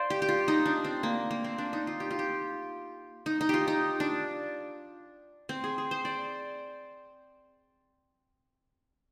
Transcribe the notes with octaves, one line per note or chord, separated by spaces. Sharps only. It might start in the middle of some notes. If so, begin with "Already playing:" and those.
Already playing: C5 D5 F5
G4
G4
F4
D#4
D4
C4
A#3
A#3
C4
D4
D#4
F4
G4
F4
G4
D#4
D#4
F4 G4
D#4
D4
C4
G#4
G#4
C5
D5